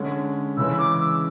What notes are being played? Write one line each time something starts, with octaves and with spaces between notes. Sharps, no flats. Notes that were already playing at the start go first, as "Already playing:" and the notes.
Already playing: D3 G#3 C#4
C#3 E3 G#3 C#4 E6
D6
E6